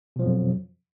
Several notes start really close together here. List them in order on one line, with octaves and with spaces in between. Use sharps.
B2 F3 F#3 F2